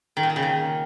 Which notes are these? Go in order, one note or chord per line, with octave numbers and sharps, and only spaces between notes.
D#3
A#2
D#3
C#3
D#3